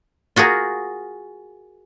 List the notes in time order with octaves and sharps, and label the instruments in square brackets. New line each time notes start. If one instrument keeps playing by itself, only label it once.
[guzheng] F4 F#4 G#4 A#4